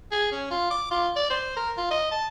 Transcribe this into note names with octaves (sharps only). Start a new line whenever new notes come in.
G#4
C#4
F4
D6
F4
D5
C5
A#4
F4
D#5
A5